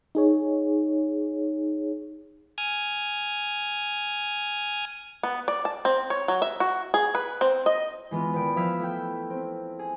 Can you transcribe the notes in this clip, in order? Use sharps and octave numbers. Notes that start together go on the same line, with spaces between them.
D#4 G#4 C#5
G#5 D#6 F6 G#6
B3
D5
A5
C4
C#5
F#3
E5
F#4
G#4
B4
C4
D#5
E3 G#3 B3 F4
D#1 B4 G5 D7
F3 E5 F5 E6 G#6 B6
A3 E4 G5
C4
G#4